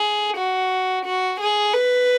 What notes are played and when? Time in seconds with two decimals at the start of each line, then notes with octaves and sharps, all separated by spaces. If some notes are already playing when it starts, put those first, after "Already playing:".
Already playing: G#4
0.37 F#4
1.05 F#4
1.40 G#4
1.74 B4